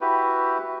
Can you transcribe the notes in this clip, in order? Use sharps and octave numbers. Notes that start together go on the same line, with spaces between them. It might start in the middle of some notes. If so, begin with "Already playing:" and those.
E4 F#4 G4 B4